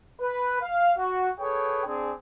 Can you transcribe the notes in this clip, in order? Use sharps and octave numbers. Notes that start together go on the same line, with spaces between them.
B4
F5
F#4
G#4 A4 B4 C#5 G5
C4 D4 G#4